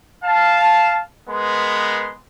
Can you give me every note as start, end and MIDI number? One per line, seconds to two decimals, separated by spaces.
0.24 1.01 77
0.24 1.01 81
1.29 2.12 56
1.29 2.12 59
1.29 2.12 70
1.29 2.12 71
1.29 2.12 84